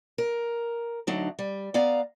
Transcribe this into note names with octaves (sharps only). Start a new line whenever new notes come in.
A#4
D2 F#3 D4 D#4
G3
B3 D5 F5 A#5